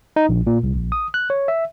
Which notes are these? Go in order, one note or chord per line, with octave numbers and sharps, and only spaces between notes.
D#4
A#1
A#2
C2
A#1
D#6
F#6
C#5
E5